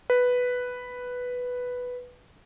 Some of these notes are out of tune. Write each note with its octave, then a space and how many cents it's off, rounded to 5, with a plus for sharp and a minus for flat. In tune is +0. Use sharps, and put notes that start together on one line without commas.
B4 +0